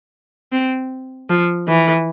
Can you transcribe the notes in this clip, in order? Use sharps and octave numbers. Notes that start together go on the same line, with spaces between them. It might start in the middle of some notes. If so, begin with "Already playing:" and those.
C4
F3
E3